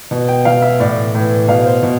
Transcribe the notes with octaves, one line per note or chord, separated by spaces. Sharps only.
B2
G5
B2 F5
E5
A2 E3 D5
A2 E3
B2 F5
C5
B2